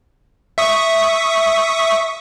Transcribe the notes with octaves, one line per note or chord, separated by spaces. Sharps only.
E5 C#6 D#6